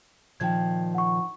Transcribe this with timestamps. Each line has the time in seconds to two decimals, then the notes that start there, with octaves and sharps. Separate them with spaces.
0.40 A#2 D#3 F3 G5 G#6
0.95 F#5 C#6